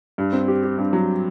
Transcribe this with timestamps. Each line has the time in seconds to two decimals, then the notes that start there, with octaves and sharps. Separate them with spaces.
0.18 G2
0.33 C4
0.48 G4
0.63 G4
0.78 G2
0.93 F#3